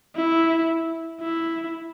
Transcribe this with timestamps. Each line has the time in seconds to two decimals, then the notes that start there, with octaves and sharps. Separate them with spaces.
0.16 E4
1.21 E4